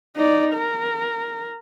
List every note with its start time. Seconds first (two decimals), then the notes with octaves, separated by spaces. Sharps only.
0.17 D#4 D5
0.54 A#4